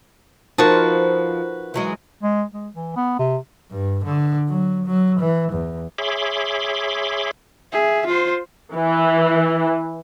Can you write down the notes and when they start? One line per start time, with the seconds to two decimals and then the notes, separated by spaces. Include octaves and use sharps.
0.58 F3 D#4 F#4 A#4 B4 A5
1.74 E3 F#3 G#3
2.23 G#3
2.53 G#3
2.74 E3
2.96 B3
3.19 C3
3.71 G2
4.04 D3
4.49 F#3
4.86 F#3
5.20 E3
5.53 E2
5.98 G#4 C#5 E5 B5 C6 D6
7.72 G#4 E5
8.07 F4 C5
8.74 E3